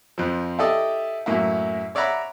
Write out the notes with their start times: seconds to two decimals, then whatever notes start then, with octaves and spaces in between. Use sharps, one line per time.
0.18 F2 F3
0.59 E4 G4 A4 D5 D#5
1.26 F#2 A2 A#3 E4
1.95 C#5 D5 E5 F#5 A#5 B5